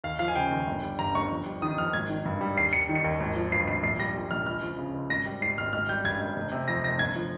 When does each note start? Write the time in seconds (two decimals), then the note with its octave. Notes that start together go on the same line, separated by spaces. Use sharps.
0.04 D#2 F5
0.19 F3 F5
0.28 G#5
0.36 C#3 G5
0.51 D#2
0.67 G1
0.83 G3
0.99 G2 A#5
1.15 G1 C#6
1.30 F2
1.46 G3
1.62 D#3 D#6
1.78 F2 F6
1.93 G#1 G#6
2.10 D#3
2.25 G2
2.41 G3
2.56 D#2 C7
2.73 G3 C#7
2.89 D#3
2.95 C#7
3.04 D#2
3.20 G#1
3.36 F3
3.52 G2 C7
3.68 G#1 C7
3.83 A#1 C7
3.99 G3 A#6
4.15 A#2
4.31 A#1 F6
4.46 C#2 F6
4.63 F3
4.78 C#3
4.94 C#2
5.10 G#1 A#6
5.26 G3
5.42 G#2 C7
5.57 G#1 F6
5.73 G#1 F6
5.89 G3 G6
6.04 G2 G#6
6.21 G#1
6.36 F1
6.52 C3
6.68 F2 A#6
6.84 F1 A#6
6.99 G1 G#6
7.16 F3